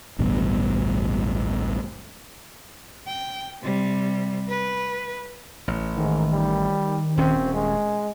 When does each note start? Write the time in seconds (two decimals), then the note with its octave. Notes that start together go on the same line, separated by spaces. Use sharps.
0.19 A1 D2 G2 B2
3.07 G5
3.63 C3 G3
4.48 B4
5.68 A1
5.97 G#2 D#3
6.32 G3
7.18 D#1 C4 C#4
7.54 G#3